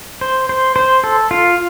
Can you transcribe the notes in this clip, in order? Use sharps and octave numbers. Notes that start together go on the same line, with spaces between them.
C5
C5
C5
A4
F4